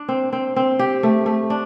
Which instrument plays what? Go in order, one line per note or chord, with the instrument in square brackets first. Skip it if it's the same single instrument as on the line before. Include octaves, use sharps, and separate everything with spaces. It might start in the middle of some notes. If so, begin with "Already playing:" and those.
Already playing: [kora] D4
C4
C4
C4
G4
A3
A3
D4